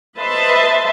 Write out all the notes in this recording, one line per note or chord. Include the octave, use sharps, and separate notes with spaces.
B4 C5 D#5 E5 A5 C6